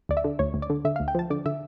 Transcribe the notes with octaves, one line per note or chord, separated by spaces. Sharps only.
D2 D5
E5
D3
D2 C#5
D2
D5
D3
D3 E5
F5
D2
G5
F3 A5
D3 D5
D3 E5